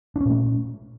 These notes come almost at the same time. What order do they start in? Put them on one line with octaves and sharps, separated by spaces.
D4 C#4 A#2 A3